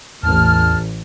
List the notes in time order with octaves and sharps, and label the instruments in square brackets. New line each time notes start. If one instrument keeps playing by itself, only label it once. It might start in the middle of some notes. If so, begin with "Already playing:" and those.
[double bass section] A1 [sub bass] E2 [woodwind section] A5 F6